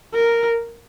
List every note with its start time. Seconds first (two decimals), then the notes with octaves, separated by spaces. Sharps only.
0.14 A#4